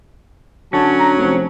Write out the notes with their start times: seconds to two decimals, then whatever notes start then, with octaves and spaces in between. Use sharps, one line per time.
0.73 D3 F#3 C#4 A5
0.99 A#5
1.17 F1 F3